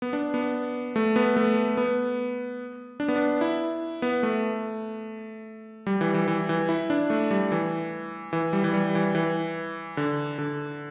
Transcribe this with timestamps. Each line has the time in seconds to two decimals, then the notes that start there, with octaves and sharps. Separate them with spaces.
0.02 B3
0.13 D4
0.34 B3
0.96 A3
1.16 B3
1.37 A3
1.77 B3
3.00 D4
3.08 B3
3.16 D4
3.41 E4
4.02 B3
4.23 A3
5.87 G3
6.01 E3
6.14 E3
6.28 E3
6.49 E3
6.69 E4
6.90 D4
7.10 A3
7.31 G3
7.52 E3
8.33 E3
8.53 G3
8.64 E3
8.73 G3
8.95 E3
9.15 E3
9.97 D3
10.38 D3